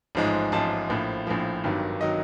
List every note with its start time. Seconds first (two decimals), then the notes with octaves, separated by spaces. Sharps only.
0.15 A1 G#2 F3 G#3
0.52 A1 G#2 F3 G#3 A5
0.89 A#1 A2 F3
1.27 A#1 A2 F3
1.64 G#1 G2 D#3 F#3
2.01 D#3 F#3 D#5